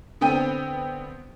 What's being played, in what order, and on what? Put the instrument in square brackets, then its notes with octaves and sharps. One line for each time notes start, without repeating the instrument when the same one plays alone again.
[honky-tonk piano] D3 B3 C4 G5 D#7